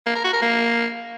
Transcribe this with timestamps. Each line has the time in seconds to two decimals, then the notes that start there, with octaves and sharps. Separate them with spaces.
0.06 A#3
0.15 A#4
0.24 F#4
0.33 A#4
0.42 A#3